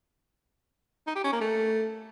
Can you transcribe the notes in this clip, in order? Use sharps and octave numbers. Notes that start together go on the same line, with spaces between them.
D#4
G4
C#4
A#3
A3